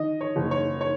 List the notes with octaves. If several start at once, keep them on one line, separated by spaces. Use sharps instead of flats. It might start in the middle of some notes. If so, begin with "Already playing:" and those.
Already playing: D#3 D#5
C#5
F#1
C#5
C#5